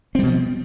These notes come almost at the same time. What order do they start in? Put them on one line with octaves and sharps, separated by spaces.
C4 G3 B2 F3